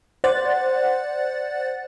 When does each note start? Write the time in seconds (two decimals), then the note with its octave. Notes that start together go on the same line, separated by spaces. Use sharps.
0.24 C5 D5 F#5 F#6 A6